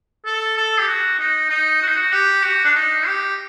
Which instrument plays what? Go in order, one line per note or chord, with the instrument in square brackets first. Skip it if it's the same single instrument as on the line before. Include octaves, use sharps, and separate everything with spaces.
[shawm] A4
A4
G4
F#4
D#4
D#4
F#4
D#4
F#4
G4
F#4
D4
D#4
G4